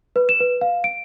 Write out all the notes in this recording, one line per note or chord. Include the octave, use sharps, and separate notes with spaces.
B4
E7
B4
F5
D7